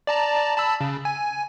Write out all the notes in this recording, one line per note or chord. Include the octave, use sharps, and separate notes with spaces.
D5 A5 A#5
A5 B5 E6
C#3
G#5